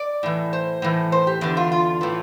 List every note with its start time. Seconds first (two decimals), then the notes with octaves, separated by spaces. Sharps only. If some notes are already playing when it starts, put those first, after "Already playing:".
Already playing: D5
0.23 A2 E3
0.53 C5
0.82 A2 E3
1.12 C5
1.27 G4
1.41 E2 D3 G4
1.57 F4
1.72 F4
2.01 A2 E3